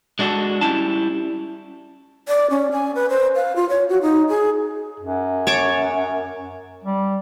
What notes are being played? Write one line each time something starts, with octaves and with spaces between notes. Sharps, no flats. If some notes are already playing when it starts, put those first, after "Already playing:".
G#3 D4 F#4 G4 A4
G3 C#4 E4 A5
D5
C#4
G#5
B4
C5
F5
F4
C#5
F#4
D#4
G#4
F#2
C#5 A5 D6
G3